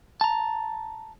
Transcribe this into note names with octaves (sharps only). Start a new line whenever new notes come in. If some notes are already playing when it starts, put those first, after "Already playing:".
A5 A#5